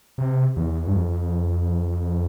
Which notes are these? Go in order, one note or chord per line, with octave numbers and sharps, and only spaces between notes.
C3
E2
G2
F2